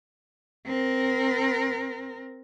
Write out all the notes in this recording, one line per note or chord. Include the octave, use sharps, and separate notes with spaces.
C4 A#4